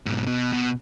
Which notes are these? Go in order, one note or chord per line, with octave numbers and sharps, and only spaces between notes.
G#2 B2
B2
B2